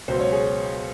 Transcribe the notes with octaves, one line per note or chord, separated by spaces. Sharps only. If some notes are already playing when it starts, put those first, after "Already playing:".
C#2 B2 F#3 B3 C5
C#5
G#4